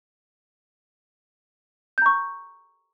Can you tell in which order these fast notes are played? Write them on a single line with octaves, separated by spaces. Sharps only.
G6 A#5 C#6